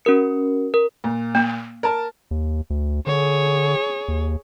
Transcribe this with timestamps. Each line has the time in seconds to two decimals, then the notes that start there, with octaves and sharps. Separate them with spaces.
0.05 C#4 F#4 A#4 C#7
0.74 A#4
1.04 A#2
1.35 A#3
1.83 A#4 A5
2.31 D#2
2.70 D2
3.07 D3 G#4 C#5
4.08 D#2